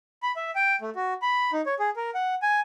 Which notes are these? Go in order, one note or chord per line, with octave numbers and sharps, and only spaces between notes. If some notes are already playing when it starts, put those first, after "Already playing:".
B5
E5
G5
A3
F#4
B5
D#4
C#5
G#4
A#4
F#5
G#5